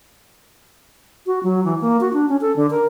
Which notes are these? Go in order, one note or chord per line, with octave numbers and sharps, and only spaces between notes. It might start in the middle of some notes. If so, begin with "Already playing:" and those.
F#4
F#3
E3
A#3
F#4
D4
C#4
A4
D3
A#4